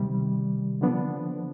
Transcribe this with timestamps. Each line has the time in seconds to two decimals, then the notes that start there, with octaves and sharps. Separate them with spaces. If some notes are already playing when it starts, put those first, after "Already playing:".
Already playing: C3 D#3 G3
0.81 D3 F3 B3 D4